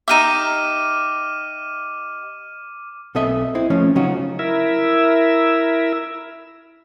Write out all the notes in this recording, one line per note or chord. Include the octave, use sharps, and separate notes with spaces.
D#4 G4 E5 D6 F6 D#7
B1 C4 A4 D#5 E5
C4 E4
F3 A3 C#4
C#3 F#3 C#4 D#4 F4 F#4
E4 A#4 E5